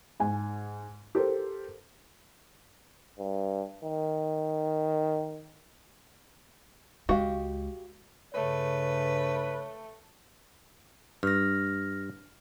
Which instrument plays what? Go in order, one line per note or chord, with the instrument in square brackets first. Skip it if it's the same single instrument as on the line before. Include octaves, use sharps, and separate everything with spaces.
[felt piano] G#2 G#5
G4 A4 A#4 C5
[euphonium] G2
D#3
[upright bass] C#2 G#3 [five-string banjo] F#4 G4 F5
[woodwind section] G2 C#3 [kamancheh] A3 [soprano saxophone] B4 [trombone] C#5
[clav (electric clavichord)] G2 [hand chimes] F6 A#6